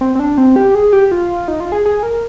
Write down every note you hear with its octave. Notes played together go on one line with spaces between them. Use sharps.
C4
C4
D4
C4
G4
G#4
G4
F4
D#4
F4
G#4
G#4
A#4